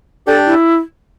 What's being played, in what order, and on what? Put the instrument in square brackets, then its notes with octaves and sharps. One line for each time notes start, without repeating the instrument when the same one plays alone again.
[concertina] D4 G4 D5 G5 [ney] A4
[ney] E4